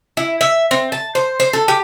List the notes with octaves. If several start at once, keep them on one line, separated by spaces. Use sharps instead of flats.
E4
E5
C4
A5
C5
C5
A4
G4